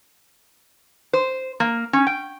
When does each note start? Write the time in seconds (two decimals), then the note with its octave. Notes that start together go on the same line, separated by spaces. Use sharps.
1.13 C5
1.60 A#3
1.93 C#4
2.07 G5